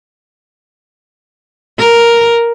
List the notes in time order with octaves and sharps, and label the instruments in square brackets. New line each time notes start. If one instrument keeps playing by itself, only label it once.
[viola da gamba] A#4